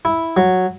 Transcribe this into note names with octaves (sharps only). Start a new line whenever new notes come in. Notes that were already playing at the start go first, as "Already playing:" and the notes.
E4
F#3